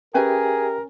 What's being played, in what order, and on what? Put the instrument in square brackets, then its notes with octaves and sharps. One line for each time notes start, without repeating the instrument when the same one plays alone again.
[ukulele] C#4 B4 G#5 [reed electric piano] G4 E5 G5 [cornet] G#4 [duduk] A#4